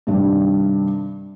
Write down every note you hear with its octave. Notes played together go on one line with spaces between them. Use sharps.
G2 C3 D#3 G3 C4 D4